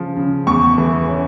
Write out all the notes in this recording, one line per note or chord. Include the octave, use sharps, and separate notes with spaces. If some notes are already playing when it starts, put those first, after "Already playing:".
Already playing: C#3 F3
C#3
E2 C#6
E3
C#4